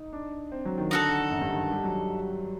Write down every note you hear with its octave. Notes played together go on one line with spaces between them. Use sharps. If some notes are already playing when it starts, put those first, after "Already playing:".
Already playing: D#4
D4
C4
F#3
D#3
D3 D#4 F#4 A4
F#2
G2
D#3
G3
F#3